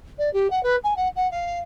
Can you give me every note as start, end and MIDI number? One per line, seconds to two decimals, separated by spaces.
0.18 0.31 74
0.33 0.50 67
0.50 0.62 78
0.63 0.76 71
0.84 0.94 80
0.96 1.08 78
1.15 1.29 78
1.31 1.59 77